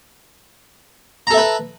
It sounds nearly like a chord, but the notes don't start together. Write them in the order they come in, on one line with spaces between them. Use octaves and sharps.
A#5 A4 E5 B4